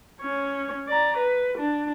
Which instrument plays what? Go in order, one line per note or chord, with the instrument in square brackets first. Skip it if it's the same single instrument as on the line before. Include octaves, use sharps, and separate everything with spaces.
[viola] C#4 C#5
D5 A#5
B4
D4